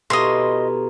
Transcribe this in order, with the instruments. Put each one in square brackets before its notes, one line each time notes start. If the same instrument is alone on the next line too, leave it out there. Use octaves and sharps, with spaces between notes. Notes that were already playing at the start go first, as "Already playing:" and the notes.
[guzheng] B2 E4 F4 [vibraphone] G4 A4 A#5 [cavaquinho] D#5 C6